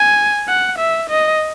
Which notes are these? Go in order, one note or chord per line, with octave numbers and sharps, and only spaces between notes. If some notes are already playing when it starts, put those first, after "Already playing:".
Already playing: G#5
F#5
E5
D#5